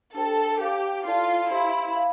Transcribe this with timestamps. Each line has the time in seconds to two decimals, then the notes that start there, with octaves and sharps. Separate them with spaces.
0.14 D4 G4 A4 C5 G5
0.60 G4 C5 F5 A5 D6
1.05 E4 F4 A4 D5 A5
1.50 E4 G4 C5 F5 C6
1.96 F5